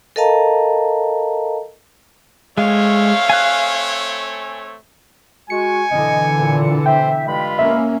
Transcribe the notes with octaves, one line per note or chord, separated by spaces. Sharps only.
A4 A#4 D#5 F5 A5 A#5
G#3 A3 C4 C#5 F5
G#5 F#6
G#3 F#4 G#5 C#7
B2 D3 E3 D#5
A#2
C5 E5 G5
G2 G#3 F4 B5
A#3 C#4 E5